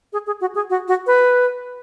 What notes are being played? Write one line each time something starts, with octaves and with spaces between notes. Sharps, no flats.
G#4
G#4
F#4
G#4
F#4
F#4
B4